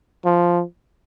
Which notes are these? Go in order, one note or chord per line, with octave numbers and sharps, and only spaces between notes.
F3